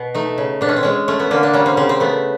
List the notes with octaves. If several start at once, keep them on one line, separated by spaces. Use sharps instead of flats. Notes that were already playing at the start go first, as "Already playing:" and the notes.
Already playing: B2
A3 D#4
C#3
B2 D4
C#4
C4
G#3 C#4
A3 C#4
B3
D3 A#3
D4
G3 C#4
C4
C#3 C4
C4
A3 B3